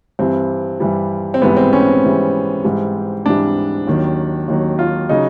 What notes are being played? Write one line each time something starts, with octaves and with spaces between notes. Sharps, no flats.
G2 E3 G3 C4
G2 E3 G3
C4
G#2 E3 G3 B3
C4
C#4
C4
G#2 E3 G3
G#2 E3 G3
G#2 E3 G3 D4
D#2 D#3 F#3
D#2 D#3 F#3
F4
C#3 F#3 D#4